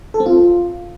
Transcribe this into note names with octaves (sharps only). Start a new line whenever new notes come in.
A4
C4
F4